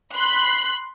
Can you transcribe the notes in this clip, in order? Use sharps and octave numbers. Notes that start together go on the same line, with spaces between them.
B5 C6 F#6 B6